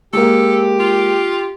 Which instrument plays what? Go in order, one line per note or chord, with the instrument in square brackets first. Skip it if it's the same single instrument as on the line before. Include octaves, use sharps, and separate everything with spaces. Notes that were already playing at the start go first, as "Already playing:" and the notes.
[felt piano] G#3 A#3 [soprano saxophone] G4 [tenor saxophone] A4
[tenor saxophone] F4